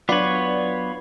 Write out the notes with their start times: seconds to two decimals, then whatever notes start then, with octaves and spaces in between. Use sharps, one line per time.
0.09 F#3 B3 D4 F4 B4 C#5 D5